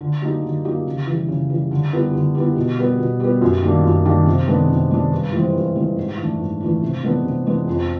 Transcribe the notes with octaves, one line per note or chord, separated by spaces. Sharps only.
D3
F#3 A#3 D#4 G4
D3
F#3 A#3 D#4 G4
C#3
E3 G3
C#3
E3 G3
D3
G3 B3 E4
D3
G3 B3 E4
B2
G3 B3
B2
G3 B3
F#2
D#3 G3 A#3 D4
F#2
D#3 G3 A#3 D4
C3
D#3 G#3 B3 D4
C3
D#3 G#3 B3 D4
G2
E3 G#3 C4
G2
E3 G#3 C4
G#2
E3 A3 D4
G#2
E3 A3 D4
C3
E3 G#3 B3 D4
C3
E3 G#3 B3 D4
F2